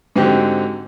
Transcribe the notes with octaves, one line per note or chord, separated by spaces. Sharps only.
G#2 D3 C4 D#4 F#4 G4